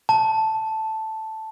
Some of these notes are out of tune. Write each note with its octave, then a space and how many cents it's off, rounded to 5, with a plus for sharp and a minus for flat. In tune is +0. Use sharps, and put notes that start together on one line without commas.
A5 +0